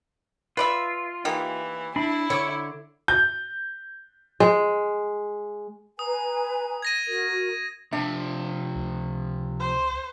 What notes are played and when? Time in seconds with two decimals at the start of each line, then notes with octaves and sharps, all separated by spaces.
0.57 F4 B4 D5 E5
1.25 E3 A#3 D#4 G4
1.96 D4 E4 B5
2.30 D3 A4 C#5 D6
3.08 G6
4.40 G#3
5.99 B4 G#5 A#5 D#6
6.82 G#6 A#6 D#7
7.08 F#4 A#4
7.92 C3 F3 D4 E5
8.75 C#2
9.59 C5